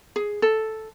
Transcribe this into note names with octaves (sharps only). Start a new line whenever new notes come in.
G#4
A4